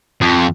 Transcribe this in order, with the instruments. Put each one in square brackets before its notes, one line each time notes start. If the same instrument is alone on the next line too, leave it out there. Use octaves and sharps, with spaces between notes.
[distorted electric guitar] F2